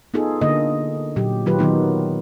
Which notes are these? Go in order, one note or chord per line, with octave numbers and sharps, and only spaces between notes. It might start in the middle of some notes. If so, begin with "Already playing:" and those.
B3 D#4 F4 G#4 A4
D3 A#3 D#5
A#2 F#3 G4
D#3 F#3 F4 G4 B4
D#3 F#3 B3 D#4